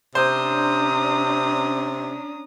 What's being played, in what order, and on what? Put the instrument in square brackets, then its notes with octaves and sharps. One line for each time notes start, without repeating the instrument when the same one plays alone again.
[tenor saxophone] C3 [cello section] C#4 D4 [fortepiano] C5 [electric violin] A#5 D#6